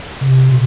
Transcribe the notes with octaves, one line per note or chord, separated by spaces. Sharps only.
C3
B2